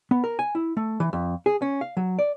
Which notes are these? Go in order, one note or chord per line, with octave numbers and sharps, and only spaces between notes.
B3
A#4
G#5
E4
A3
E3
F2
G#4
C#4
F5
F#3
D5